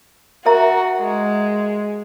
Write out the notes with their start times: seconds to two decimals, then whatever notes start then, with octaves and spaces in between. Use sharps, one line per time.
0.46 F#4 A#4 E5 A#5
1.00 G#3